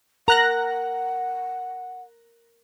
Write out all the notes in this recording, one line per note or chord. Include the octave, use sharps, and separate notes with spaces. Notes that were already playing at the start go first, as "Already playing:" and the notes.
A#4 F#5 A#5 F#6 A#6